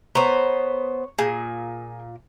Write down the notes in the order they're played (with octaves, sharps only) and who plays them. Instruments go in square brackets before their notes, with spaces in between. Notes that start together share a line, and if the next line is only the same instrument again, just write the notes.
[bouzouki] B3 C5 [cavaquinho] C#5 A#5
[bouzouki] A#2 [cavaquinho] G#4